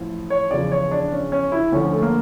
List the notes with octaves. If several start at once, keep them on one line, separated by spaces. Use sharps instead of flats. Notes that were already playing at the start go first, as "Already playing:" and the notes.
Already playing: A1 A2 F3
C#5
E2 C#3 F3 D5
C#5
D4
C#4
C#4
E4
D2 D3 F3 C#4
A3
A#3